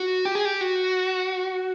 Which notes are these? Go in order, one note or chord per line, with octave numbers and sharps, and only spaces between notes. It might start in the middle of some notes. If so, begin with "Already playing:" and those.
Already playing: F#4
G4
G#4
G4
F#4